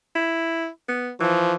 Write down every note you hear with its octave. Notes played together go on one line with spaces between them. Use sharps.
E4
B3
E3 F3